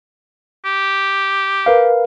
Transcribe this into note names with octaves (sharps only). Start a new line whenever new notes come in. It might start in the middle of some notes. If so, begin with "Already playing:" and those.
G4
A#4 B4 F5